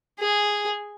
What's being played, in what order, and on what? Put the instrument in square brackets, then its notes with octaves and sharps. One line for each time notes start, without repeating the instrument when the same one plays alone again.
[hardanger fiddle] G#4